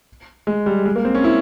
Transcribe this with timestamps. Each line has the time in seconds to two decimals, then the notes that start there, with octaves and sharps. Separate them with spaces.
0.47 G#3
0.66 G3
0.86 G#3
0.96 A#3
1.05 C4
1.15 C#4
1.24 E4